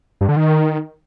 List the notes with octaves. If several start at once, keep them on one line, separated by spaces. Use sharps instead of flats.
G2
D3
D#3